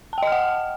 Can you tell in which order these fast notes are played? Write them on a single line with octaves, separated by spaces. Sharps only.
A5 G5 D#5 F6 F#5